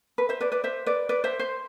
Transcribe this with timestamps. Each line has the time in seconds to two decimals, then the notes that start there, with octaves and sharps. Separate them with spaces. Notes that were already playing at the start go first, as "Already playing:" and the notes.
0.18 B4
0.29 C5 E5
0.41 B4 D5
0.52 B4 D5
0.64 C5 E5
0.86 B4 D5
1.09 B4 D5
1.24 C5 E5
1.40 C5